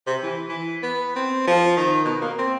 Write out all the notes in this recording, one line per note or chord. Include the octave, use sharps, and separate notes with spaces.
C3
E3
E3
B3
C4
F3
D#3
B2
A#3
C4